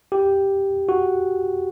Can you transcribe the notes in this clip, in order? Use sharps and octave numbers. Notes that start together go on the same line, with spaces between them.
G4
F#4